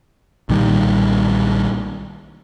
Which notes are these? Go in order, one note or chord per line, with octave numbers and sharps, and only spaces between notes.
B1 A#2 D#3 G3